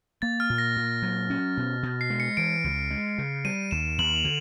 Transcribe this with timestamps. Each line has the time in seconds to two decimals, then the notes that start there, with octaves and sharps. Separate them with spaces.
0.22 A#3 A6
0.40 F6
0.50 A#2
0.58 A#6
0.76 A#2
1.02 F#3
1.30 C#4
1.57 B2
1.83 B2
2.01 C7
2.10 G#3
2.20 C#7
2.37 E3 D7
2.64 C#2
2.91 G#3
3.18 C#3
3.45 G3 D#7
3.71 D#2 E7
3.98 D#2 F#7
4.16 F7
4.25 D3